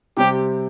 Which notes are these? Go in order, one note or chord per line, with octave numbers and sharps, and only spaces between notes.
C3 G3 C4 G4